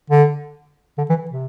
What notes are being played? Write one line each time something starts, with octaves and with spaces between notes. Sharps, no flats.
D3
D3
E3
C3